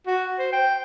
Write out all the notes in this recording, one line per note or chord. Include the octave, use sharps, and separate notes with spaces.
F#4
C5
G5